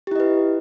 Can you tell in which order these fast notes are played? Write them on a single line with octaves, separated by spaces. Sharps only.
G4 E4 D#5 B4